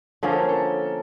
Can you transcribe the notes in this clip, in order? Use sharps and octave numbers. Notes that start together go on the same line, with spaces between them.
D3 F3 A#3 C#4 G#4
A4
A#4
A4